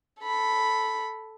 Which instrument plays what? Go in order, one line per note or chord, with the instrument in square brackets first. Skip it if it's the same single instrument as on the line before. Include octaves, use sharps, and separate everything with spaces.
[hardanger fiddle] A4 B5